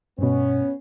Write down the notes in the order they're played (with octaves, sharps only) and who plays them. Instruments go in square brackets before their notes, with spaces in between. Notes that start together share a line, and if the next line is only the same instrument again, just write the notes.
[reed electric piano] G2 B2 [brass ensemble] B3 C#4